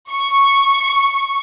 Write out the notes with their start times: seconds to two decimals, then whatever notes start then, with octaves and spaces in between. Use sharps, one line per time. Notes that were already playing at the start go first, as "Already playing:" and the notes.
0.11 C#6